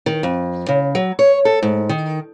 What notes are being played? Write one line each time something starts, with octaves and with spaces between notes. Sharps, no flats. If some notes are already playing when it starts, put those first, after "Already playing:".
D#3
F2
C#3
F#3
C#5
A4
G#2
D#3